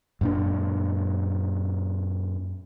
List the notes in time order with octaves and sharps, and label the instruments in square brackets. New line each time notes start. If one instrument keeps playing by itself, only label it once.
[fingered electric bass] F#2 A#2 D4